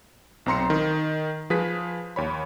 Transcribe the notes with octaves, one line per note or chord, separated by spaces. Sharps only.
B1 C4 A#5 C6 C#7
D#3
F3 G#4 B4 B6
D#2 C#5 B5